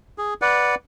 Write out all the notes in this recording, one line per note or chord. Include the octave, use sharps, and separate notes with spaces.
G#4
B4 D5 F#5